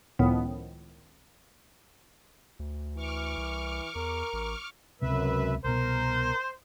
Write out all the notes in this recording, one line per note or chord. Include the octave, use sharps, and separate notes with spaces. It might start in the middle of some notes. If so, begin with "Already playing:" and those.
C#2 A2 D#3 F3 B3
D2
E3 C#6 D6 F6
C2
E2 A#4
A1
C#2 F#2 C3 G#3 B4 E5
C2 B2 A#4 C5